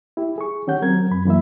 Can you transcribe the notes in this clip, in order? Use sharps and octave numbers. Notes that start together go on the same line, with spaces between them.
E4 G4
G#4 C#6
D#3 C#4 G4 F#5 G6
F#3 C4 A#4 G#6
F#2 B5
F#2 E3 A#3 E4 E5